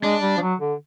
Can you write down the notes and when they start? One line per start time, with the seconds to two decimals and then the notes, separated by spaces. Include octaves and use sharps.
0.03 G#3 D4
0.22 G3
0.37 F3
0.41 F#3
0.60 D3